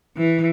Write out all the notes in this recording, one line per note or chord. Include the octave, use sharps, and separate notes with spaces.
E3